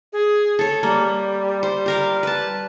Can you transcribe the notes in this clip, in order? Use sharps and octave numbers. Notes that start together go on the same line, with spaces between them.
G#4
A4 C#5
G3 A#3
C5
G4 A#4 F5
B4 A5